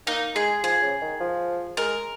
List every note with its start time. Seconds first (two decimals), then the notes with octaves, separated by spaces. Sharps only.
0.07 A#3 D#4
0.35 G#3 G#4
0.63 F3 G#4
0.82 C#3
1.01 D#3
1.20 F3
1.77 G#3 A#4